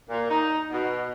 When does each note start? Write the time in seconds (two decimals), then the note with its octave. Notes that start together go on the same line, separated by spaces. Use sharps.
0.10 A#2
0.29 D#4
0.71 B2